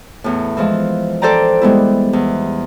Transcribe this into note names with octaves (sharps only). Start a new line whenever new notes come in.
E2 A2
E3 F3 G#3
A4 C5 D5 G5 A#5
G3 G#3 B3 E4
E2